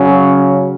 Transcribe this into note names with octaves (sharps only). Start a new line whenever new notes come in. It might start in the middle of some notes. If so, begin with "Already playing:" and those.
Already playing: C#3 F#3 C#4